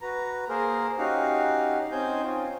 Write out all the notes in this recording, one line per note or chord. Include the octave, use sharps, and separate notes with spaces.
F#4 B4 A#5
A#3 G#4 A#4 C5
C#4 D#4 F#4 G4 F5 F#5
C4 C#4 D#4 C5 G#5 G6
C4 C#4 F4